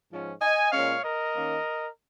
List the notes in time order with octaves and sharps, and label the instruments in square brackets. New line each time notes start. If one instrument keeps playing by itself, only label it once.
[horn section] G#2 F3 C#4
D#5 G#5
A#2 G#3 C#4 C#5 F5
A#4 D#5
D#3 A#3 C#4